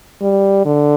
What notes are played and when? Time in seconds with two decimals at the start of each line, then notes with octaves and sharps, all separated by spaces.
0.21 G3
0.65 D3